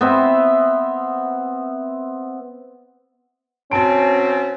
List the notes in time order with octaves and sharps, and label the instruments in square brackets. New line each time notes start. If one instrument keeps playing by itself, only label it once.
[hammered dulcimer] B3 C4 E5
[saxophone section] B2 C4 [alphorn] C#4 [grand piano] A5 D7